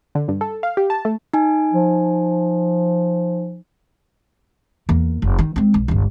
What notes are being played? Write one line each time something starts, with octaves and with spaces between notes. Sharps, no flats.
D3
G2
A4
F5
G4
A5
A3
D#4 G#5
F3
E2 A#3
F1
D#3
G#3 C4
B1
G1 C#2